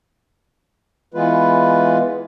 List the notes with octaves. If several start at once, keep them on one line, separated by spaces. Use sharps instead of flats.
E3 G#3 B3 F4 B4